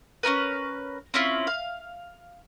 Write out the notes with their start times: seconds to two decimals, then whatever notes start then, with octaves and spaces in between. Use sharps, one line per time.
0.23 C#4 D#4 A#4 B4
1.14 C4 C#4 E4 F4
1.47 F5